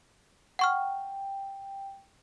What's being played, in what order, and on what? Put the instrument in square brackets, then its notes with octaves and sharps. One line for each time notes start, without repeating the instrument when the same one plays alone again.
[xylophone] F#5 C#6 F6 [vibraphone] G5